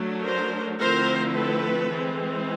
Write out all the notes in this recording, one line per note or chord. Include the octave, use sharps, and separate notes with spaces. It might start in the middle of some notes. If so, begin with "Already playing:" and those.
Already playing: F#3 A3 D4
A#4 C5
D3 F3 A3 C4 E4 A#4 C5
A4 B4
E3 G#3 C4